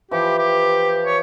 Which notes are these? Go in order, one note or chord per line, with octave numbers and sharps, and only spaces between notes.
E3 F3 G4
G4
C#5